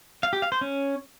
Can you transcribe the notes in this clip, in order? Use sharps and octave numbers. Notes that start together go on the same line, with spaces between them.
F5
G4
F5
C5
C#4